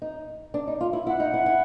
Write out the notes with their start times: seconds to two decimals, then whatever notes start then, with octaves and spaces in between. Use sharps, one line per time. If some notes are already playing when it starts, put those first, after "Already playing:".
0.02 D#4
0.54 D4
0.67 D#4
0.81 F4
0.93 E4
1.07 E4 F#5
1.20 D#4
1.34 E4
1.46 E4